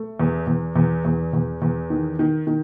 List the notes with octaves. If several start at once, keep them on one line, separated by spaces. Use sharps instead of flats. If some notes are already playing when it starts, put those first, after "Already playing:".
Already playing: A3
E2
E2
E2
E2
E2
E2
D#3
D#3
D#3